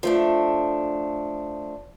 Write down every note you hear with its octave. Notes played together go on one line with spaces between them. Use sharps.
F3 A3 D4